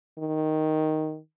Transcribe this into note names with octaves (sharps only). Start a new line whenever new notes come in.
D#3